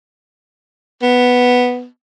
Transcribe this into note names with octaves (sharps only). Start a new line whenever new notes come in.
B3